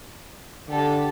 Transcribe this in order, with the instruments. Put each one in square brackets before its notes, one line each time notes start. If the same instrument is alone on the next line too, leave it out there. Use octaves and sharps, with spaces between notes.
[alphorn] D3 [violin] G4 A4